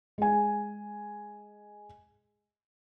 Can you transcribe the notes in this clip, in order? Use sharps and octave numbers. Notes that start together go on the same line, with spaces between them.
G#3 G#5